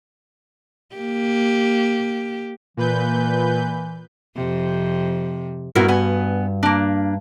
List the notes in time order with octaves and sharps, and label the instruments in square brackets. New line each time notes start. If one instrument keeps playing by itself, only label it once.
[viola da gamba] A#3 G4
[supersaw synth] A#2 B4 G6 [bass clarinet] E3
[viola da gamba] F2 C3
[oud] G2 F#4 [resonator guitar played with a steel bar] B3 E4 A#4
[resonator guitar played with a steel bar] B3 G#5
A#3 D4